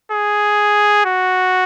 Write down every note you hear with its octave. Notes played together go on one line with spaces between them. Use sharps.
G#4
F#4